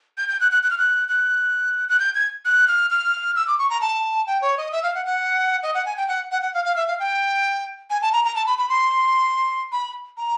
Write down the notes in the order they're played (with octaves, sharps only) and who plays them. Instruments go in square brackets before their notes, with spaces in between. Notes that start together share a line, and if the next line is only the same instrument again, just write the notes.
[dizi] G6
G6
F#6
F#6
F#6
F6
F#6
F#6
F#6
G6
G#6
F#6
F6
F6
E6
D6
C#6
A#5
A5
G5
C#5
D#5
E5
F5
F#5
F#5
D#5
F#5
G#5
G5
F#5
F#5
F#5
F5
F5
E5
F5
G5
G#5
A5
A#5
A#5
A5
B5
B5
C6
B5
A#5